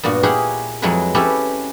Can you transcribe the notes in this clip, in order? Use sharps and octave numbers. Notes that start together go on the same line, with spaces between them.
G2 A#2 B3 F#4
E4 G4 G#4 A#4 C#5 F#5
F2 F#3 G#3 E4 B4
C4 C#4 E4 G4 A4 B4